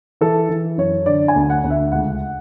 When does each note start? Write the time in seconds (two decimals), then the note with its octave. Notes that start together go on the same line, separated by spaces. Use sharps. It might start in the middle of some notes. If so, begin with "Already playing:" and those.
0.21 E3 A4
0.49 E3
0.78 F#2 C#5
1.06 D3 D5
1.28 G#5
1.36 D2
1.50 F#5
1.64 D2
1.70 E5
1.92 C#2 F#5